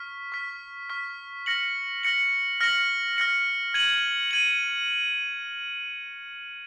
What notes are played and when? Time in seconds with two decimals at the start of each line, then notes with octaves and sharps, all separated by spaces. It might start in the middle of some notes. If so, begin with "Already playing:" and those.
Already playing: C#6 F6 B6
0.32 C#6 F6 B6
0.89 C#6 F6 B6
1.46 F6 A#6 C#7 F#7
2.03 F6 A#6 C#7 F#7
2.60 F6 A#6 C#7 F#7
3.17 F6 A#6 C#7 F#7
3.74 G#6 D#7 F#7
4.31 G#6 D#7 F#7